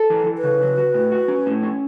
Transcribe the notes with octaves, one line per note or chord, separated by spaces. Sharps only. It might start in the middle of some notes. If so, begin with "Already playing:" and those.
Already playing: A4
E3
E3
B4
C#3
F#3
F#4
A2
F#4
C#4
A2
C#4